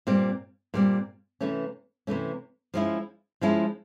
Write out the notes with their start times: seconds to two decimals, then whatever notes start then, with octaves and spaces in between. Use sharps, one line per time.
0.07 A#2 G3 C4
0.74 A#2 G3 C4
1.41 C3 E3 A3 C#4
2.07 C3 E3 A3 C#4
2.74 F3 G#3 C#4 E4
3.41 F3 G#3 C#4 E4